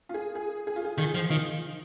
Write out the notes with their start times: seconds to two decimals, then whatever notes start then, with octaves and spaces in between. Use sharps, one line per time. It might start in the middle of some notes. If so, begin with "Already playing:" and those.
0.09 F4
0.14 G#4
0.35 G#4
0.67 G#4
0.76 F4
0.85 G#4
0.98 D#3 G#4
1.15 F3
1.30 D#3 F4